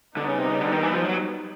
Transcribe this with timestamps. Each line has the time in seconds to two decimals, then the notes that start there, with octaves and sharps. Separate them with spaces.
0.17 D3 G3 B3 D#4
0.27 C#3
0.39 C3
0.49 C#3
0.61 D3
0.72 D#3
0.83 E3
0.94 F3
1.05 F#3